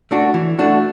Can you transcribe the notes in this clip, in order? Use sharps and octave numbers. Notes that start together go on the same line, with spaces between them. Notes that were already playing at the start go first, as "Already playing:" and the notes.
A3 D4 F#4
E3
A3 D4 F#4